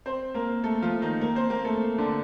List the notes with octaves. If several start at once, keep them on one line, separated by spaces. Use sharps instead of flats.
C4 C5
A#3 A#4
A3 A4
F3 F4
D#3 D#4
A#3 A#4
C4 C5
A#3 A#4
A3 A4
D3 D4